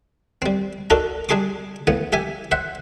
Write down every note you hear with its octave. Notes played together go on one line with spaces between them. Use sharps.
G3 C4
D4 D#4 F#4 A4 A#4
G3 D4 G#4 C6 D6
A2 C#3 B3
G4 E5 G#5
C5 E5 F#5